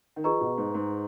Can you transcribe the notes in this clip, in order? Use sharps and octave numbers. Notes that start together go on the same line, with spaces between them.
D#3
F3 G#4 B4 D#5 A#5 C#6
B2
G#2
G#2